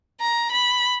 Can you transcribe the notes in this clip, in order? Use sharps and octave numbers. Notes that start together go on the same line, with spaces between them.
A#5
B5